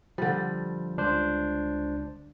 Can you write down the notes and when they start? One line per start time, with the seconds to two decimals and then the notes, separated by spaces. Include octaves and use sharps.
0.18 D3 F3 G3
0.97 C#2 D4 C5